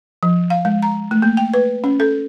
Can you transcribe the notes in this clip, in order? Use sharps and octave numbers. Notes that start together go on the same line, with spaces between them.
F3
F5
G#3
A#5
A3
A#3
G5
B4
C#4
A4